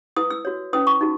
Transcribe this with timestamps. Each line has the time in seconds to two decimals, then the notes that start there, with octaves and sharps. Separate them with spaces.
0.17 E4 B4 D#6
0.30 E6
0.45 F#4 C#5
0.73 C#4 E4 B4 D#6
0.87 C#6
1.01 D#4 F#4